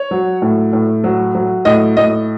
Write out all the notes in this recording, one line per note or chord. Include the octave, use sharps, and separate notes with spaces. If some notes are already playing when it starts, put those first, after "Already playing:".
Already playing: C#5
F#3
A2
A2
F#3
F#3
A2 D#5
A2 D#5